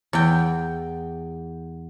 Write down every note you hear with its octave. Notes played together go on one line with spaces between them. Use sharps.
E2 G5